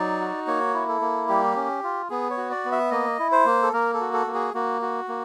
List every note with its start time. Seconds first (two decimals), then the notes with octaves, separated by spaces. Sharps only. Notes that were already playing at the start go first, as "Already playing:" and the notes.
Already playing: F#3 D#4 D5
0.20 F#4
0.47 A#3 C#5
0.74 E4
0.89 A4
1.01 A#3
1.29 G3 G4
1.56 C#4
1.84 F4
2.10 B3 G#4
2.30 C#5
2.37 F#4
2.51 D5
2.65 B3
2.72 E5
2.91 A#3 D#5
3.19 E4
3.32 C5
3.45 A#3
3.62 A4
3.73 A#3 A#4
3.94 A4
4.01 F#4
4.13 A4
4.27 A#3
4.34 G#4
4.54 A#3 F#4
4.82 F#4
5.08 A#3